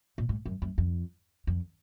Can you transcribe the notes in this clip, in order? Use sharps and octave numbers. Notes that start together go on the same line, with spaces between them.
A#2
G#2
F#2
F#2
F2
F2